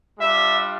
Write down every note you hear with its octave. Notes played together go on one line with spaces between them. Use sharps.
G3 D4 F4 E5